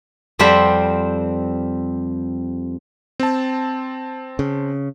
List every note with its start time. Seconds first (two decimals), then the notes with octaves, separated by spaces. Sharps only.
0.39 F2 G3 C4 C5 F#5 B5
3.20 C4 A5
4.39 C#3